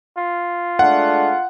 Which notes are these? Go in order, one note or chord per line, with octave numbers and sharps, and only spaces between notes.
F4
G#3 A3 D4 F#5